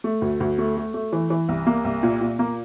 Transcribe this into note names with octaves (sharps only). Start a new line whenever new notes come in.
A3
D2
D2
A3
A3
A3
E3
E3
C2
A#3
C2
A#2
A#2
A#3